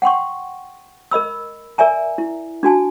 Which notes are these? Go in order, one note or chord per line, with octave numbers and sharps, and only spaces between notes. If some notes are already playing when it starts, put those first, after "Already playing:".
F#5 G5 C6 C#6
A#4 D#5 B5 E6
A#4 D5 E5 G#5 A#5
E4
D4 F#4 G#5 A5